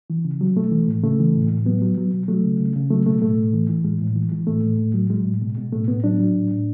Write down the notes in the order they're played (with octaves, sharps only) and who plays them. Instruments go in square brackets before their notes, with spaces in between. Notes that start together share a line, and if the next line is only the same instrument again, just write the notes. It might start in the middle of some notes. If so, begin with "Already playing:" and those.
[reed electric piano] E3
C#3
F#3
B2 A3
E3
A2
C#3 A3
E3
A2
A2
F#3 B3
F#3
F#3
B2
F#3 A3
C#3
C#3
C#3
F#3 A3
B2 A3
A2 A3
A2
E3
E3
A2 G#3
A2
E3
E3
A2 A3
A2
A2
F#3
F#3 G#3
A2
B2
B2
A2 A3
A2 B3
F#3 D4
F#3
A2
A2